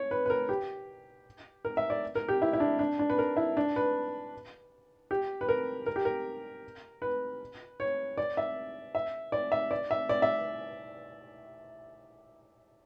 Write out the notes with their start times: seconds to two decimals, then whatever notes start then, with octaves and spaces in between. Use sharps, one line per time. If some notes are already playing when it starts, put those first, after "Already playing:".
Already playing: C#5
0.11 B4
0.26 B4
0.30 A#4
0.49 G4
1.65 A#4
1.77 E5
1.90 D5
2.15 A#4
2.28 G4
2.42 E4
2.53 E4
2.60 D4
2.79 D4
2.99 D4
3.10 B4
3.19 A#4
3.37 E4
3.57 D4
3.76 B4
5.11 G4
5.41 B4
5.49 A#4
5.86 A#4
5.96 G4
6.05 A#4
7.02 B4
7.80 C#5
8.18 D5
8.37 E5
8.95 E5
9.32 D5
9.52 E5
9.71 D5
9.91 E5
10.09 D5
10.22 E5